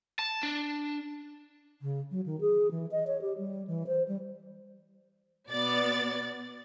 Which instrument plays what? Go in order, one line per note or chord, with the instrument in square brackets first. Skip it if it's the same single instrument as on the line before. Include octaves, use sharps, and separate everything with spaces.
[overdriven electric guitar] A5
D4
[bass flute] C#3
F#3
D#3
G#4
E3
D#5
C#5
G4
G3
E3
C5
G3
[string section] B2 B3 D5 A6